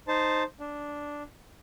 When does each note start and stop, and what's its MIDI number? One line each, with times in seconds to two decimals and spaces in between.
0.08 0.43 63
0.08 0.43 72
0.08 0.43 81
0.60 1.23 62